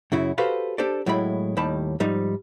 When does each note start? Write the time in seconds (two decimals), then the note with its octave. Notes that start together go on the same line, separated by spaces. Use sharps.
0.12 F#2 C#3 E4 F#4
0.38 F#4 G4 A4 B4 C5 F5
0.78 D4 G4 A4 C5 D5
1.06 A2 F#3 G#3 E4 G5 B5
1.57 D#2 A2 D#3 G3 A5 B5
2.00 G#2 F3 G3 D#4